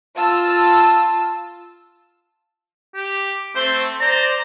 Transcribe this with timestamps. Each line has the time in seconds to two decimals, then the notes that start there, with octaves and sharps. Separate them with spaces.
0.15 F4 A5 E6
2.95 G4
3.56 A3 C4 C5
4.00 C5 D5 A#5